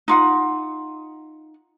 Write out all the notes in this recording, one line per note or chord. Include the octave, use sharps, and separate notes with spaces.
D#4 F4 F#5